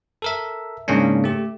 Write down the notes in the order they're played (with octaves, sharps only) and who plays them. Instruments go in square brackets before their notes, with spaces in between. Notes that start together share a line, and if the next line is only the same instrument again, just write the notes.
[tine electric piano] A4 A#4 E5
G#2 C#3 A#3 C#4 D4
A3 G4